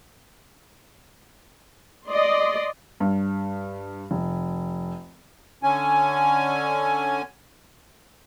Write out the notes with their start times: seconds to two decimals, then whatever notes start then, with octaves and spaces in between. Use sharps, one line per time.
2.07 D5 D#5 C6
3.00 G2
4.11 F1
5.63 D3 C#4 G#5